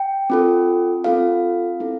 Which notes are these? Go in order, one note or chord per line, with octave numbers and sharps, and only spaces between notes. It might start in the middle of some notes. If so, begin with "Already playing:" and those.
Already playing: G5
C4 F4 A4
C4 F4 A4 F5
C4 E4 A4